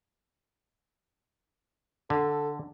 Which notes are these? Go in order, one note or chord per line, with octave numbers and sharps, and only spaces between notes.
D3 A4